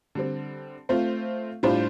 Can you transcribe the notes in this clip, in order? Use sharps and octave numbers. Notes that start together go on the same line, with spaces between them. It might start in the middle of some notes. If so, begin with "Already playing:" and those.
D3 G3 C4
A3 C4 F4 C5
A2 G3 D4 F4 C5